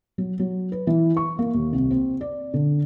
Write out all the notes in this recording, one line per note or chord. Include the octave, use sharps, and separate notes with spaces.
F#3
F#3
B4
E3
C#6
A#3
D#2
C2
C4
D5
D3